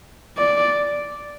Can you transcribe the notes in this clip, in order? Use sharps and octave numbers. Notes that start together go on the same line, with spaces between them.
D5